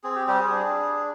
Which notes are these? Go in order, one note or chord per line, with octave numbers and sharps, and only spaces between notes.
C4 G#4
G4
G3 G4
G#4
D4